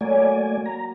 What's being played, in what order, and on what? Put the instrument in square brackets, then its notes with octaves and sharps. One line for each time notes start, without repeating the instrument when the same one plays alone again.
[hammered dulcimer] F#3 A#3 [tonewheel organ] A3 D5 G#5
[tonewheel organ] A#5